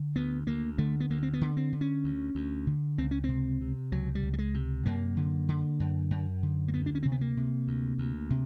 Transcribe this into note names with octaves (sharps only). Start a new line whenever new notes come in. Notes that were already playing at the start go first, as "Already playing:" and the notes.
Already playing: D3
D2 B3
D2 A#3
D3 A3
B3
D2 A#3
C4
B3
D3
C4
D3
C#4
D2
D2
D3
C#2 C4
C#4
C3 C4
C3
C#2 F#3
G3
C#2
G3
G#3
C3
F#2 A#3
D3
D3
F#2
F#2
D3
A#3
D2 B3
D4
C#4
C3 C4
B3
A#3
C3
D2
D2
C3